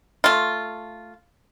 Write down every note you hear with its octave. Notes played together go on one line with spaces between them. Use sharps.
A3 F4